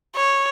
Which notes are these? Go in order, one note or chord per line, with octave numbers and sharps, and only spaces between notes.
C#5